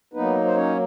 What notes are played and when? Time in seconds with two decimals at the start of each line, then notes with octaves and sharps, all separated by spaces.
0.14 F#3 A#3 B3 D#4 B4
0.45 C5
0.56 C#4 C#5